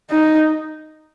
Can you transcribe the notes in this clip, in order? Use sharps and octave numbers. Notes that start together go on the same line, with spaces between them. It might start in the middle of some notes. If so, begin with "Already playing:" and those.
D#4